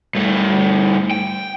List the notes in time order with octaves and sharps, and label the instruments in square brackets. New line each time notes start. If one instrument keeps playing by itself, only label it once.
[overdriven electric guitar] G2 A3
G5